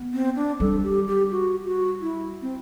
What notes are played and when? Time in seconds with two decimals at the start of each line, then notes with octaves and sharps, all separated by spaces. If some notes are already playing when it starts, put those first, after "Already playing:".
Already playing: B3
0.13 C4
0.36 D4
0.60 G3 A4
0.83 G4
1.07 G4
1.31 F#4
1.65 F#4
2.01 E4
2.42 C4